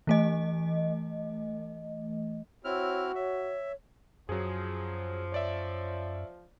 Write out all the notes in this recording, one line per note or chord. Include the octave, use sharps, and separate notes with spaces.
E3 A3 D#5
C4 E4 F#4 C#5 F6
C#5 E5
F#2 F3 F#3 G#4
C#5 D5 E5